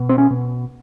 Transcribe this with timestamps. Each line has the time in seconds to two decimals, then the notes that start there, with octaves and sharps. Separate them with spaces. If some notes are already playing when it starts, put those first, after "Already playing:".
Already playing: B2
0.09 C4
0.18 C#4
0.31 B2